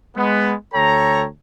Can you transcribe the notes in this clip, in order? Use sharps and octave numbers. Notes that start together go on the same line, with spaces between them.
G#3 B3
D2 A4 C#5 G5 A#5